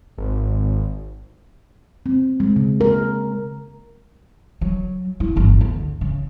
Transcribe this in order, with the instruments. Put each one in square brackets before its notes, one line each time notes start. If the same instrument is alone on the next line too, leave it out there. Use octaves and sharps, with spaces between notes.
[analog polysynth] G#1
[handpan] C4
G#3
C#3
A#4
[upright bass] F#3
E4
G1 E2
D2
C#3